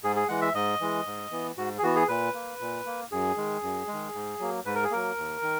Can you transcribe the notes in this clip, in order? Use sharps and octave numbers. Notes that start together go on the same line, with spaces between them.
G#2 G#4
G#4
E3 G#3 F#5
E5
G#2 D#5
E3 G#3
G#2
E3 B3
G#2 F#4
G#4
E3 B3 F#4
G#4
A#2 B4
A#3
A#2
A#3
F#2 G#4
D#3 G#3
F#2
D#3 G#3
G#2
F#3 A#3
G#2 B4
A#4
G#4
F#3 A#3 A#4
D#2
D#3